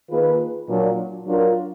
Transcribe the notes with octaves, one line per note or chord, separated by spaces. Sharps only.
D#3 A#3 F4 G#4 B4
A#2 F#3 D4
F#3 D4 F4 A#4